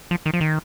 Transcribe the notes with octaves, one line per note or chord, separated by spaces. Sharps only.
F3
D#3
F3
D#3